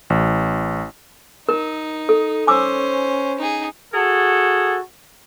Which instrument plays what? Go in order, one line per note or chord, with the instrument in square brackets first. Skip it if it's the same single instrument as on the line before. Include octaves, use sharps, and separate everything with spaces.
[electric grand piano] A1
[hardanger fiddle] D#4 [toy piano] A#4
[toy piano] A4
[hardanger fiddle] C#4 C5 [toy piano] G#5 D6 E6
[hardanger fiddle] D#4 G#4
[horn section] F#4 G#4 A4